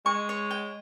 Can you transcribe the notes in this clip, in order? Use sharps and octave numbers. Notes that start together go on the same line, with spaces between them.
G#3 C#6
C#5
G5